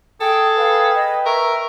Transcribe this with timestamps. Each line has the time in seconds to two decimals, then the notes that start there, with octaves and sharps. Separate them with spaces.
0.21 G#4 A4 G5
0.58 B4 F5 G5
0.95 D#5
1.26 A#4 E5 C#6